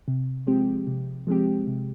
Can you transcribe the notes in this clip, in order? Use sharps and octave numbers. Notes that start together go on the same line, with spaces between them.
C3
F3 G#3 C4 G4
C3
F3 G#3 C4 G4
C3